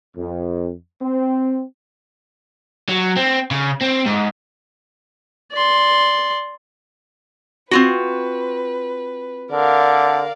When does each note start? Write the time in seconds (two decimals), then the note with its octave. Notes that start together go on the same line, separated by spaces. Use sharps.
0.16 F2
1.01 C4
2.89 F#3
3.16 C4
3.51 C#3
3.82 C4
4.06 G#2
5.52 D5 C6
7.71 C4 F4 F#4 B4
9.52 D3 A#4 D5 F5